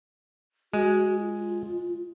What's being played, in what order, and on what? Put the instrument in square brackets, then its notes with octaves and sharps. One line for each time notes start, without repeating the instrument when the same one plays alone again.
[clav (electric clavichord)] G#3 [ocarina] F#4
[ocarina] F4